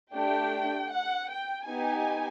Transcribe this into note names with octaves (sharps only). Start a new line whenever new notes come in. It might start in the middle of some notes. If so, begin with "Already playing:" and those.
A3 D4 G4 G5
F#5
G5
B3 D#4 G4 G#5